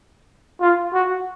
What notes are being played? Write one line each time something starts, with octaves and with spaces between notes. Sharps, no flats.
F4
F#4